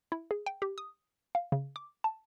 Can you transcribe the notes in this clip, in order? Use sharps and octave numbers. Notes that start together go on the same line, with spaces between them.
E4
G#4
G5
G4
D#6
F5
C#3
D6
A5